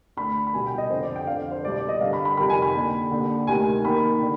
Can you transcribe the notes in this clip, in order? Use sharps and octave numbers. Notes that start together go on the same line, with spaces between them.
D2 D3 B5
B5
C2 B2 G#5
G5
D#5
F2 D3 C5
D5
G5
F2 D3 F5
C5
C2 B2 D5
D5
D#5
G2 D3 F5
B5
B5
F2 C3 D#3 B5
G#5
B5
D#2 D3
D#2 D3
D2 C3 D#3 G#5
D#2 D#3 B5
D3